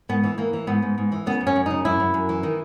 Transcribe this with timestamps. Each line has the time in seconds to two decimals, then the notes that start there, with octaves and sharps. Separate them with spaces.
0.09 G#2 B3
0.24 E3
0.38 E3 A#3
0.53 E3
0.67 G#2 B3
0.82 G#2
0.98 G#2
1.12 E3
1.26 C#3 B3
1.41 F#2
1.47 C#4
1.56 F#2
1.66 C#3 D#4
1.85 F#2 E4
2.00 F#2
2.14 F#2
2.29 E3
2.43 D#3